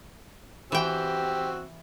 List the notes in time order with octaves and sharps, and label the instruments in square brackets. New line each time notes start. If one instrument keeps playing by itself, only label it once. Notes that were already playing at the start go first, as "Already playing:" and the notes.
[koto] E3 G5 [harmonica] C4 F#4 E6 [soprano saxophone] G4